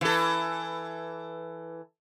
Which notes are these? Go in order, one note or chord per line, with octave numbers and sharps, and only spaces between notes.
E3 A4